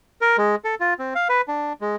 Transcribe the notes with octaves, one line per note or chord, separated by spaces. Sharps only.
A#4
G#3
A4
F4
C4
F5
B4
D4
G#3